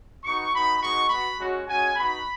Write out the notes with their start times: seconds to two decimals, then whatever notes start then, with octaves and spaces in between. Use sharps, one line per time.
0.24 B3 D#4 F#4 C#6
0.52 B3 D#4 F#4 B5
0.81 G#3 B3 D#4 F#4 C#6
1.09 B3 F#4 B5
1.38 G#3 C#4 F#4
1.66 G#3 C#4 F#4 G#5
1.96 B3 D#4 F#4 B5